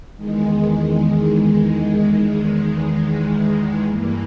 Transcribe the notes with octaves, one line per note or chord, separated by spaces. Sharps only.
E2 D#3 G#3
G2 E3 A#3